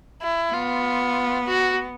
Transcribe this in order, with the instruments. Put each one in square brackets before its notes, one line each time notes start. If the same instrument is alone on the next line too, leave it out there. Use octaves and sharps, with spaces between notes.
[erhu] E4
[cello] B3 [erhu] F4
[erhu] F#4